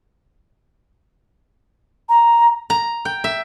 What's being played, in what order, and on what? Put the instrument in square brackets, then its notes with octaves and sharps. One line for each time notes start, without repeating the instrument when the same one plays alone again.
[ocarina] A#5
[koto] A#5
G5
E5